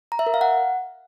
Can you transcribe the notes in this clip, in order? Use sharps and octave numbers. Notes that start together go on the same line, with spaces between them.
A#5
E5
A#4
F5
F#5